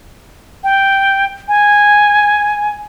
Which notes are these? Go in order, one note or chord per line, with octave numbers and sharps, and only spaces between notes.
G5
G#5